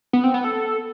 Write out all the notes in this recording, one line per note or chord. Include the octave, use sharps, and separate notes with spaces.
B3
C4
B3
A4